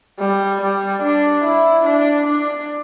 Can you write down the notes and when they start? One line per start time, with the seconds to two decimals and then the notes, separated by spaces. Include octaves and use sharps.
0.19 G3
0.61 G3
1.02 D4
1.44 E4
1.86 D4
2.27 D4